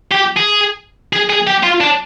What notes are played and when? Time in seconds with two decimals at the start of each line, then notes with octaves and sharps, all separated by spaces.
0.12 G4
0.37 G#4
1.13 G#4
1.30 G#4
1.47 G4
1.63 F4
1.80 D4